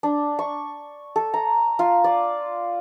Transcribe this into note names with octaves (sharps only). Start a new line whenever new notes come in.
D4
C#6
A4
A#5
F4
D5